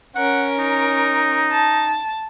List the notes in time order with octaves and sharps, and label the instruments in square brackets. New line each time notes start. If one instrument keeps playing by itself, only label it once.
[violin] C#4 A#4 [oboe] F#5
[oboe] D#4
[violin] A5